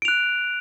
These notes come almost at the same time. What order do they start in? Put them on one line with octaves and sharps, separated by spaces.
D7 F7 F#6